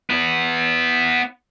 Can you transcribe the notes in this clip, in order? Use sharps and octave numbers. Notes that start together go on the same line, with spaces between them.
B3 E4